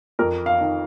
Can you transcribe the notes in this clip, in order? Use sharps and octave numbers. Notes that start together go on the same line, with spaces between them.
F2 A#4
F5
D#3